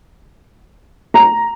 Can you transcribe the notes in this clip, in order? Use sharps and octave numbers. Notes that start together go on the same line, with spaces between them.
A#5